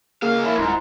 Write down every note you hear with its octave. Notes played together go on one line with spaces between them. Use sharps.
C#2 A#3 G#4 A#4 F5
C#4 E4
D#1 G#2 E4 A#5 C6 F#6